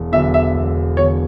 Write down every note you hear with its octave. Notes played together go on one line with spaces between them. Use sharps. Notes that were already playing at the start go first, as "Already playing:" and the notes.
Already playing: E1
E2 D3 F#3 E5
E5
E1
E2 D3 F#3 C#5